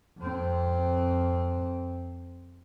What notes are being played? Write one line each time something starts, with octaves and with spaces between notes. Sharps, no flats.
F2 C4